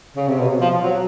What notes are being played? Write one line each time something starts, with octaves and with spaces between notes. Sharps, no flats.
C#3
C3
B2
F3
F#3